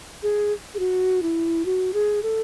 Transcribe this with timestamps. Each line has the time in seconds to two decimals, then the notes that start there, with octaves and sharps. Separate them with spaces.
0.23 G#4
0.74 G#4
0.79 F#4
1.22 E4
1.65 F#4
1.93 G#4
2.23 A4